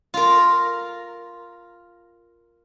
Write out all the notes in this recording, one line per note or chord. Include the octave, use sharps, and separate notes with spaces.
F4 A#4